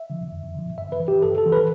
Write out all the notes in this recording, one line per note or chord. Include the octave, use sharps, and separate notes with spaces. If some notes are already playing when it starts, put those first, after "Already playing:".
Already playing: E5
D3 F3
F2
D3 F3
G2 E5
B4
E3
G4
G2 A4
A4
E3
B4